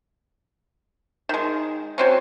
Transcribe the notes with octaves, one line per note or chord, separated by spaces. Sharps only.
D#3 G#3
F#3 C4 C#4